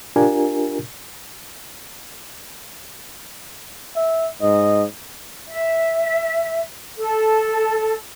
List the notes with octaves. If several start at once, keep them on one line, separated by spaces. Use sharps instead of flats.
D4 F4 G4 A#4 G#5
E5
G#2 D#5
E5
A4